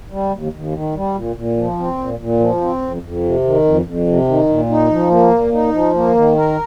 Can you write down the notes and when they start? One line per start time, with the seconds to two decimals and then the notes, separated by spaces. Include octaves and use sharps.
0.10 G3
0.32 D#2
0.52 D#2
0.73 D#3
0.95 G3
1.15 A#2
1.36 A#2
1.57 F3
1.78 C4
1.98 A#2
2.19 A#2
2.40 F3
2.61 C4
2.82 F2
3.02 F2
3.24 C3
3.44 D#3
3.65 F2
3.85 F2
4.07 C3
4.28 D#3
4.49 A#2
4.70 D#4
4.90 F3
5.10 A#3
5.31 A#2
5.52 D#4
5.73 F3
5.94 A#3
6.15 D#3
6.35 A#4